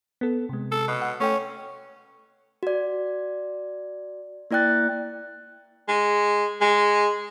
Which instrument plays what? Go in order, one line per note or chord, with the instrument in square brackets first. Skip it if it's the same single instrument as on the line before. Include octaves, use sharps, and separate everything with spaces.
[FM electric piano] B3 A4
C3 G#3
[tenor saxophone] A4
B2
[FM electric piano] F#5
[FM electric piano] A3 A4 G5 [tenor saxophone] C#4
[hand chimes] F#4 D5
A#3 E4 D5 G5 F#6 A6
[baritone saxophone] G#3
G#3